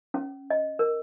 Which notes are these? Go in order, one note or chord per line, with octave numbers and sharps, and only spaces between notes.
C#4
D#5
A#4